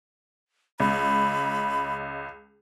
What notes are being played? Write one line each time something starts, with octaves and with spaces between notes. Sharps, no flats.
C#2 B5